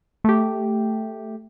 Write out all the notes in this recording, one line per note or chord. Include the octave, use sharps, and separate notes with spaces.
A3 G4